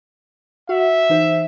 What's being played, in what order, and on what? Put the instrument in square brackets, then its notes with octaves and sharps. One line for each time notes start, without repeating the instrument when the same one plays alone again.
[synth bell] F#4 F#5 [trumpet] E5
[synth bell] E3 D#4 C5